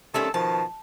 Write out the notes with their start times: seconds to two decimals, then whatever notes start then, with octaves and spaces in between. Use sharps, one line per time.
0.14 D#3 G3 A3 C4 C#4 A4
0.34 B2 D#3 F3 A5